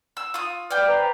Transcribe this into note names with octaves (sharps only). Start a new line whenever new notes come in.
E6
F4 D#6
B4 D5 G5 D6 F6
B4 C5 A#5